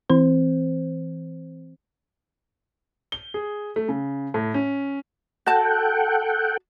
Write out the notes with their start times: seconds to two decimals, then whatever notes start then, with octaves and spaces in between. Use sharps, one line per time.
0.10 E3 C4 C5
3.12 G7
3.34 G#4
3.76 A3
3.89 C#3
4.34 A2
4.54 C#4
5.46 F#4 A4 F#5 G5 A5